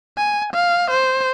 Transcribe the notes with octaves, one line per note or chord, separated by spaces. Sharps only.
G#5
F5
C5